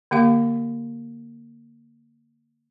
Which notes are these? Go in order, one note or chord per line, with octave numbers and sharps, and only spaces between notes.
D3 A#3 G4 F5